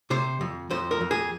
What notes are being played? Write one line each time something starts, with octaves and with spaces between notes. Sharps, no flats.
C3 C5
F2
F2 C5
A#4
F2
G#4